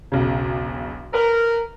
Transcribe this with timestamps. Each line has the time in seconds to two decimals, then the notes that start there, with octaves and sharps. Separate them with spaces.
0.12 E1 B1 C#3
1.14 A#4 B4